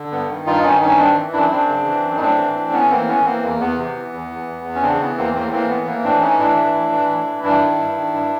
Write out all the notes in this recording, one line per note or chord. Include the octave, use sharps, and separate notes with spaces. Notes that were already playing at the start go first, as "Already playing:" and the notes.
Already playing: D3
G2 B3
D#3
G2 D#4 F4
D#3 C#4 D#4
G2 C#4 D#4
D#3 C4 D4
E3
F#2 D4 E4
F#2 C4 D4
C#3
E3
F#2
D#4
A2 C4 D4
E3
A2
E3 B3 C#4
A2 A#3 C4
E3 B3 C#4
E3 A#3 C4
E2 A#3
E2 B3
C3
E3
E2
E3
E2
E2
C#4
C#3 C4 D4
E3 B3
E2 A#3 C4
A2 A#3 C4
E3 A#3 C4
A2 B3
E3 A#3
A2 C4 D4
E3 C#4 D#4
A2 D4 E4
E3
A2
E3
A2
E3
G2 D4 E4
D#3
G2
D#3
G2